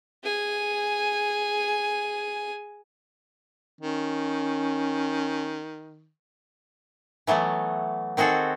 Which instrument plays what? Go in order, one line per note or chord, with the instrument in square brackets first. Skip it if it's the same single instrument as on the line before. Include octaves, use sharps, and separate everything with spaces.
[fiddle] G#4 G#5
[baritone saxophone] D#3 [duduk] C#4
[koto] E3 F#3 A3 B3
D#3 C4 F#4 G#4 A4